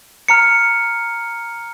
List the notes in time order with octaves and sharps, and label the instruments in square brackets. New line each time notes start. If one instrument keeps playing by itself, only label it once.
[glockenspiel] A#5 F6 C#7